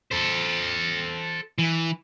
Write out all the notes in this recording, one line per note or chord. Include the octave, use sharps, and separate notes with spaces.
A4 C5
E3